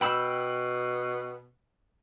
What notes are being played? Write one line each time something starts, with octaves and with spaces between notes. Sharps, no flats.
B2 G5 B5 E6